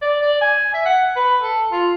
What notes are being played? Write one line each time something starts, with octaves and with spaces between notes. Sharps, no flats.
D5
D5
G#5
E5
F#5
B4
A4
F4